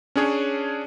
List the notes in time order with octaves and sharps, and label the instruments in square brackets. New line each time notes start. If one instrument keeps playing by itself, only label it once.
[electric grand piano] C#4 D4 G#4 C#5